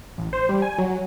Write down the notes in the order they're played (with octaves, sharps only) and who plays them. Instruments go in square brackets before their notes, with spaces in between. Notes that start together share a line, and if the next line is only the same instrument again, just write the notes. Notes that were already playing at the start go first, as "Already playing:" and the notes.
[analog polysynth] A1
C5
G3
G#5
F#3